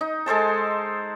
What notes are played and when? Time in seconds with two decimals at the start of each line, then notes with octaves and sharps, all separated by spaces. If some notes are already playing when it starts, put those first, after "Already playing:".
0.01 D#4
0.26 G#3 A4 C5 A5